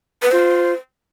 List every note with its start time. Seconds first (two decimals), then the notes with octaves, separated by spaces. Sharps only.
0.22 B4
0.31 F4 C5